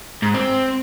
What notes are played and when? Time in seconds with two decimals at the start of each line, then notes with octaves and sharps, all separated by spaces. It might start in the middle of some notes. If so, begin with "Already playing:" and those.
0.22 G#2
0.34 C4